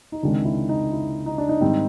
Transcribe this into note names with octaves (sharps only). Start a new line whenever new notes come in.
D#4
C#2 C3 D#3 G#3 D4
E4
D#4
E4
D#4
D4
D#4
G#2 D#3 G3 C4